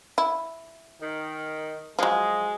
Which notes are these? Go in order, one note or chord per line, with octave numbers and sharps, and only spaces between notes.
E4
D#3
F3 F#3 G#3